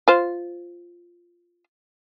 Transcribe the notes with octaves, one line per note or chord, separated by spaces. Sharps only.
F4 C5